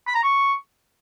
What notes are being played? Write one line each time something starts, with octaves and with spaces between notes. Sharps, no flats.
B5
A#5
C#6